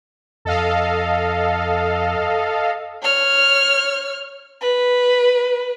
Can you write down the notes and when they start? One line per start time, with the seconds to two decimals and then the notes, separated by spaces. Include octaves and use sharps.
0.45 F2 A4 D#5 F5
3.02 C#5 F6
4.61 B4